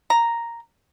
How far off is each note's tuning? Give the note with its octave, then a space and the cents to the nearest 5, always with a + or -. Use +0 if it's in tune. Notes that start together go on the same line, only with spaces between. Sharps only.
A#5 +0